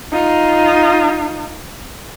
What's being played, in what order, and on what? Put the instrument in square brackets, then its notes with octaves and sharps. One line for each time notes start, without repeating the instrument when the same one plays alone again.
[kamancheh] D#4 F4